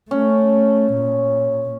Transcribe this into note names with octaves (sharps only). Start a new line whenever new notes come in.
A3 C#4
A#2